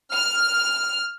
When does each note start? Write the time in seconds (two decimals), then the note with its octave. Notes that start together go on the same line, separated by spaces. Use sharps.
0.11 F6